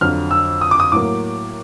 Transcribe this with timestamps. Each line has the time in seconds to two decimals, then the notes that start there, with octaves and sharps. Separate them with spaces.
0.01 F2 D3 F#3 F6
0.31 E6
0.61 D#6
0.71 D6
0.80 D#6
0.92 A2 F#3 A#3 D6